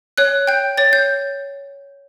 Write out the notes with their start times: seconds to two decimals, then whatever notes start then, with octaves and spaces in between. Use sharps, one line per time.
0.18 C#5 F#6
0.47 G5 G6
0.77 C#5 A6
0.93 G6